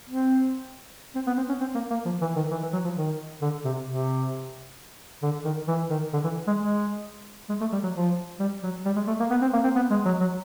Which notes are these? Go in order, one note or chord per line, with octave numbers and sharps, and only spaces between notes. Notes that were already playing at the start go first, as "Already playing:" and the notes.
C4
C4
B3
C4
C#4
C4
A#3
A#3
F3
E3
D#3
E3
E3
F#3
F3
D#3
D3
C3
C3
D3
D#3
E3
D#3
D3
E3
G#3
G#3
G#3
A3
G3
F#3
F3
G3
F#3
G3
G#3
A3
A#3
B3
C4
A#3
C4
B3
G#3
F#3
F#3